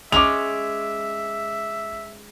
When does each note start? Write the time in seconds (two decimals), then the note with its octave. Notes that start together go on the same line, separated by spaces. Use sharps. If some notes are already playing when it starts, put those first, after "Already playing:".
0.12 G#3 C#4 E5 D6 F7